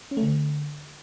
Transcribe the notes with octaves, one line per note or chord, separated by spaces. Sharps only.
C#4
A3
D3